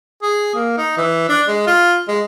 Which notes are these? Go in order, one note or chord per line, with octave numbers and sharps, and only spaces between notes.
G#4
A#3
D#4
E3
D4
G#3
F4
G#3